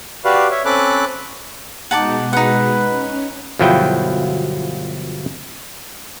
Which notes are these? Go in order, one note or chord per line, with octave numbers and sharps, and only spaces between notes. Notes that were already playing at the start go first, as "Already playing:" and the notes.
F#4 G4 B4 D5 F5
C#5 E5
C4 C#4 A4 B5 D6 F#6
B2 G#3 D#4 F#5 A5 D6
D#4 B4 F#5
C#4
G1 B2 F3 F#3 E4 G5